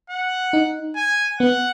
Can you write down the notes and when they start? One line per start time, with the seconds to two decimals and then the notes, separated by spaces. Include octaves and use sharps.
0.10 F#5
0.53 D#4
0.96 G#5
1.40 B3 F#5